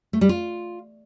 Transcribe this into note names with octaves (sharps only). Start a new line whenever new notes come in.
A3
G3
F4